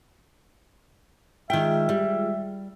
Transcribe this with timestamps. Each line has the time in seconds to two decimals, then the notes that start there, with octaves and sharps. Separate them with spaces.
1.50 D#3 G#3 F4 G#4 E5 G5
1.89 G3